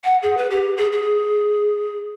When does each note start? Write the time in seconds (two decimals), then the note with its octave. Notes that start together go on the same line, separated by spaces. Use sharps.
0.04 F#5
0.23 G#4
0.37 B4
0.50 G4
0.77 G#4
0.92 G#4